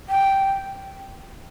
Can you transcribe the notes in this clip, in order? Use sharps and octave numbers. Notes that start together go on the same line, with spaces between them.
G5